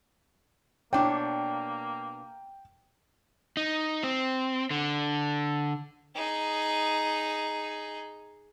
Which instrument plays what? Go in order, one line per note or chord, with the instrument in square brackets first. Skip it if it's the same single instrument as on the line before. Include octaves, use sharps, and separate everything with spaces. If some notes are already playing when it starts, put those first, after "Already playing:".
[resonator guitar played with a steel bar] B2 D4 C#5 [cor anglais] A#3 [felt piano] G5
[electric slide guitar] D#4
C4
D3
[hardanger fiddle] D#4 G#4